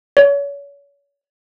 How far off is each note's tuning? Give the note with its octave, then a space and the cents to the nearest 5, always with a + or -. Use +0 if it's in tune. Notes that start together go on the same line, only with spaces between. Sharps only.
C#5 +35